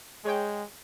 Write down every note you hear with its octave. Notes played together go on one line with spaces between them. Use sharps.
G#3 G#4 C#5 G5